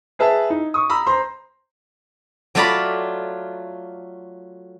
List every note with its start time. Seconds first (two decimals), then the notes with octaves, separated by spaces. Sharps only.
0.19 G#4 B4 E5 A5
0.50 D#4
0.74 C#6 D#6
0.89 A#5 B5 E6
1.07 C5 A#5 C6
2.55 F#3 A3 F4 D5 A#5 B5